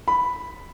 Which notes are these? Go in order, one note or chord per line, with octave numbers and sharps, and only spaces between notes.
B5